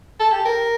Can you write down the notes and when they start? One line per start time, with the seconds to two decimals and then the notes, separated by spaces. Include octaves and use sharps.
0.20 A4
0.32 G4
0.45 A#4